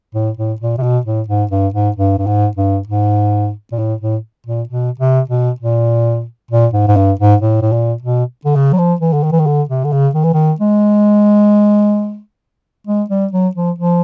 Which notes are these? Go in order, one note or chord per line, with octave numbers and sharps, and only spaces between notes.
A2
A2
A#2
C3
B2
A2
G#2
G2
G#2
G2
G2
G#2
G2
G#2
A#2
A2
A2
A#2
B2
C3
B2
A#2
A#2
G#2
G#2
G2
G#2
A2
A2
A#2
B2
D3
C#3
F#3
F3
E3
D3
D#3
E3
D#3
D3
C3
D3
C#3
D#3
E3
D#3
G#3
G#3
G3
F#3
F3
F3